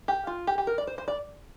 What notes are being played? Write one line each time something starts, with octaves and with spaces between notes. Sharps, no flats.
G4
F4
G4
G4
A#4
D5
C5
C5
D5